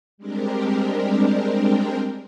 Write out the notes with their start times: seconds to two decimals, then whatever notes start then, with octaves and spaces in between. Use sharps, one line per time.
0.18 G3 G#3 C4 D4 G4 A#4